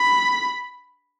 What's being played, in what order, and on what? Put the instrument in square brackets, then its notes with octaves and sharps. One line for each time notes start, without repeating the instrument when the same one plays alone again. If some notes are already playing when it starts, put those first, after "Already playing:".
Already playing: [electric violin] B5